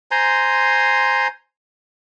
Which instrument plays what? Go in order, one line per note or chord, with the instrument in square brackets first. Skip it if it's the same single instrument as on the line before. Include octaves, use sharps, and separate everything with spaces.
[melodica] C5 G#5 A#5 C6